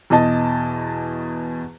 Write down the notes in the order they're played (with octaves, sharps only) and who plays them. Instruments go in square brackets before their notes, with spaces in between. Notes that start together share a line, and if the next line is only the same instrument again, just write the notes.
[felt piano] E2 B2 D#5 A5